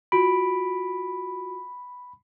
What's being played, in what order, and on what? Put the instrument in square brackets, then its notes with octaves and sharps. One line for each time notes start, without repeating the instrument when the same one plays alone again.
[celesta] F4 F#4 D7 [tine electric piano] B5